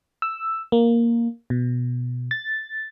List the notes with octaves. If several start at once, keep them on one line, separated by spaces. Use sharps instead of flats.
E6
A#3
B2
A6